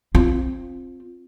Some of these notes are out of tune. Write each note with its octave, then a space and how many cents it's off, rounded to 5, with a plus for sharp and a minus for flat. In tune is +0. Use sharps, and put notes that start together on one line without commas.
C4 +10 F4 +5